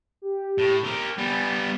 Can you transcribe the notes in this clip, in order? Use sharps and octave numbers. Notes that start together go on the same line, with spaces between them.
G4
A2
G4 A#4 F6
G3 B3 G#5